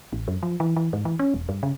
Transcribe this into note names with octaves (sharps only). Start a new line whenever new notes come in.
A1
F#2
F3
E3
E3
G#2
E3
C#4
E1
G2
C#3